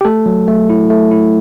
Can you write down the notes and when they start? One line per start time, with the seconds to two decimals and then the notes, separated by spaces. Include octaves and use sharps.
0.01 G4
0.05 A3 A4
0.26 F#3
0.48 A3
0.70 E4
0.90 A3
1.11 E4